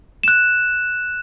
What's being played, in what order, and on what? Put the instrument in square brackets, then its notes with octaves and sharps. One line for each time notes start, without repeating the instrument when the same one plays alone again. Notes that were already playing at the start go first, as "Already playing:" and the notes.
[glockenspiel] F#6 E7